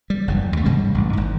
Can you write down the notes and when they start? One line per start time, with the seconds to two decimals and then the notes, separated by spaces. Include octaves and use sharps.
0.10 G3
0.28 F#1 E2 G2
0.53 D#2 A3
0.65 G#2 C#3 G3 G#3
0.94 A1 G2
1.13 G#1 G#2